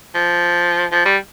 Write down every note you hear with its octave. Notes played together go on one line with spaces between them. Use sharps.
F3
F3
G3